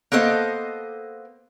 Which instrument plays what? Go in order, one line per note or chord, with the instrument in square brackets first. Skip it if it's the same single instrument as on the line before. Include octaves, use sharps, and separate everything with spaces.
[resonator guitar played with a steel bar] A#3 B3 A4 C5 D#5